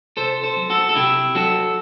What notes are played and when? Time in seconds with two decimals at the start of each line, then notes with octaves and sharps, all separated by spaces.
0.17 C3 A4 C5
0.43 A4 C5
0.57 F#3
0.70 F#4 A4
0.89 A4
0.95 C3 E4 G4
1.35 F#3 F#4 A4